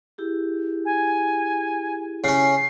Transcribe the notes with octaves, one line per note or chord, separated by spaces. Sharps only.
E4 G4 G#4
G#5
C#3 C#4 C7